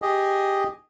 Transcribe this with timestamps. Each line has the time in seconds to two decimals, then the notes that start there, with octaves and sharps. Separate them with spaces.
0.02 G4 G#4 D#5